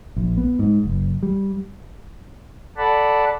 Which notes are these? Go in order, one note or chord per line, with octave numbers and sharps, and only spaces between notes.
A#1
B3
G#2
F#1
G3
A4 D5 F#5 A5 B5